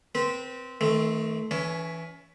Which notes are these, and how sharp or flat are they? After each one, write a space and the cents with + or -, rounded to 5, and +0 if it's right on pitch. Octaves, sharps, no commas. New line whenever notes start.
C4 -10 B4 -30
D#3 +35 A3 +0 C4 +0
E3 +0 C#4 +30 C#5 +0